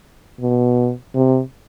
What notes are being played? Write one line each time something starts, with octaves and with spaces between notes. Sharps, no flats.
B2
C3